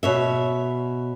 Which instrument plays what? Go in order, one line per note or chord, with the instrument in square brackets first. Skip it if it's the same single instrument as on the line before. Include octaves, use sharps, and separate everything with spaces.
[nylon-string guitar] B2 C#5 E5